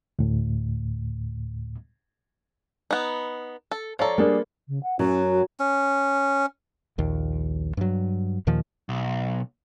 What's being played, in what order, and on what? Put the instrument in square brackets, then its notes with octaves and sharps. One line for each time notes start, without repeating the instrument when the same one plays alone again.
[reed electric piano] D2 A2
[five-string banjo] B3 D#4
A4
[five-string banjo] F3 A4 [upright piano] C#5 D5 A#5
[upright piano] G3 D4 G#4 [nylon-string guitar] A#3
[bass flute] C#3
F#5
[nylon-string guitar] F#2 F#3 [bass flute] C#4
[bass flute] F#4
[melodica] C#4
[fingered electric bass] A#1 D#2
G2 F#3
D#2 A#2 D#3 F3
[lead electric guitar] B1